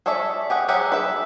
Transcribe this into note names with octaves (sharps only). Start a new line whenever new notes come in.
G#4 A4 C#5 D5 E5
G4 G#4 F#5
F#3 G4 G#4 E5 F#5
B4 E5